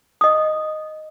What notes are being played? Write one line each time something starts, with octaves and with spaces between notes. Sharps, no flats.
D#5 D#6